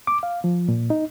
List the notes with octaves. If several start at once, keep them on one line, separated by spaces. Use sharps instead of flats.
D6
F5
F3
A#2
D#4